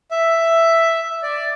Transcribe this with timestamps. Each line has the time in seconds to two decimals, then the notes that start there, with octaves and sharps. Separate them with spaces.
0.11 E5
1.23 D5